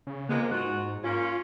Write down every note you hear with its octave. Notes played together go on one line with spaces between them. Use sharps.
C#3
F3 G#3 A#3 B3
G#2 F4 F#4 F#5
A#3 C#4 F4